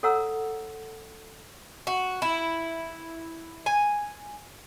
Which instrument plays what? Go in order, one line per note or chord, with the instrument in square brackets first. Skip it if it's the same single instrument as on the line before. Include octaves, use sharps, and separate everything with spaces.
[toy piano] A4 C#5 F#5 A#5 E6
[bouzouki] F#4
E4
G#5